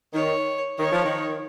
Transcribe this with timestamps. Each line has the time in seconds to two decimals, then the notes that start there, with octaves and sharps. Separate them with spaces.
0.14 D#3 C#5
0.78 D#3 C#5
0.92 F3
1.04 D#3